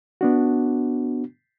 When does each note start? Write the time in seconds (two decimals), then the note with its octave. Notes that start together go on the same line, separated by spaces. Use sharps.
0.21 B3 D4 F#4